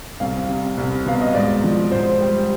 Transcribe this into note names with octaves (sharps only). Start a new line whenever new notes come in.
C2 F5
C3
C2
B2 F5
D#5
G#2 D5
F3
G#2 C5
G3